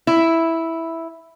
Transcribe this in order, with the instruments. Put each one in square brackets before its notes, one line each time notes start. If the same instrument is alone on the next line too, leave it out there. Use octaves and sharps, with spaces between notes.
[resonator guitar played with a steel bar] E4